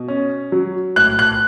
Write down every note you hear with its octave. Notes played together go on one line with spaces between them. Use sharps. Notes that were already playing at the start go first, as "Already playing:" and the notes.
Already playing: B2
C#4
F#3
A2 F#6
F#6